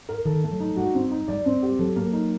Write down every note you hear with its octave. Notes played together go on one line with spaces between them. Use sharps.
A#4
D#3 A4
A3
F#3
D#4
G3 F#4
C4
D#4
G3 D5
C4
G4
F#3 A4
A#3
D#4